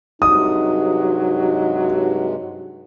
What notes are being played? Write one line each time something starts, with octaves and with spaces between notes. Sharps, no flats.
G2 C3 F#3 G#3 D#4 D#6